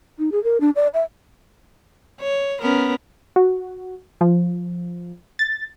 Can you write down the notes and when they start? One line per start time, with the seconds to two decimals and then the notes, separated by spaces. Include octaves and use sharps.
0.19 D#4
0.32 G#4
0.44 A#4
0.61 D4
0.75 D5
0.94 E5
2.21 C#5
2.62 B3 C#4 A#4
3.36 F#4
4.21 F3
5.39 A6